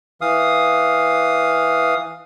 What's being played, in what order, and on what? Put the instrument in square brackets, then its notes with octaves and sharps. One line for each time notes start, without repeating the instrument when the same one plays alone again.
[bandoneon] E3 F5 D#6